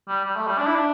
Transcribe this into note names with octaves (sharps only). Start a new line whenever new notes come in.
G3
G3
A3
G3
D4
E4
D4